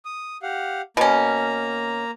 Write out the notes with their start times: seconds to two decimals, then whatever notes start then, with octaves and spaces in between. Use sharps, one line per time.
0.05 D#6
0.43 G4 F5 F#5
0.97 B2 A#3 C#4 A#5